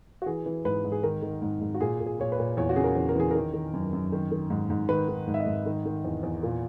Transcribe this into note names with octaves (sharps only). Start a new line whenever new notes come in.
F#4
E3 G#4
E3
G#2 B4
G#2
G#4
D#3 A#4
D#3
G#2
G#2
F#4
A#2 G#4
A#2
G#4
A#2 C#5
B4
A#2
E2 C#5
F#4
C#3 G#4
A#4
E2
A#4
E3 G#4
D#3 A#4
D#3
F#2
F#2
D#3
D#3
G#2
G#2
D#3 B4
D#3
G#2
E5
D#5
G#2
D#3
D#3
E2
E2
A#2